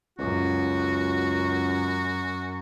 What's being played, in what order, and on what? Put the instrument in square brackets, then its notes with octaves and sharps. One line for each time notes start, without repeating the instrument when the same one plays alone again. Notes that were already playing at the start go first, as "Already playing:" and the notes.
[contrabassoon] C#2 [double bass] F#2 [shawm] F#4